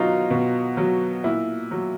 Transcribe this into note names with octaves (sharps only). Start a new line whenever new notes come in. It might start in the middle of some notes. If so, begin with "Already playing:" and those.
Already playing: B2 F#3 D#4 F4
B2
F#3
A#2 E4
F#3